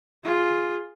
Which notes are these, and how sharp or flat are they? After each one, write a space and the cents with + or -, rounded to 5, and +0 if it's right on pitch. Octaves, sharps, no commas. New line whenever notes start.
F4 +0 G#4 +0